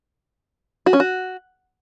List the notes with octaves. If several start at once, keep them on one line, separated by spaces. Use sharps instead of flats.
F#4
C#4
F#4